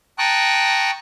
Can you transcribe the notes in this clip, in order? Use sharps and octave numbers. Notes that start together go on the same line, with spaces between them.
G5 A5 A#5 C#6 D#6 F#6